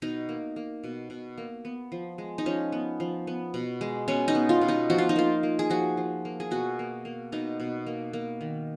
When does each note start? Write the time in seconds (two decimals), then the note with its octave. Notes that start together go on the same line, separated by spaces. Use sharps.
0.02 B2 D#4
0.29 A#3
0.56 A#3
0.84 B2
1.10 B2
1.38 A#3
1.65 B3
1.92 F3
2.18 G#3
2.38 D#4
2.46 F3 C#4
2.72 B3
3.00 F3
3.27 B3
3.54 B2
3.81 G#3
4.08 B2 C#4
4.28 D#4
4.35 B3
4.49 F4
4.61 B2
4.68 D#4
4.90 F3 F#4
4.98 F4
5.09 D#4
5.16 A#3 F4
5.43 A#3
5.59 G#4
5.70 F3 F#4
5.97 F3
6.25 A#3
6.40 G#4
6.51 B2 F#4
6.79 A#3
7.05 A#3
7.32 B2 D#4
7.60 B2
7.87 A#3
8.13 A#3
8.41 D#3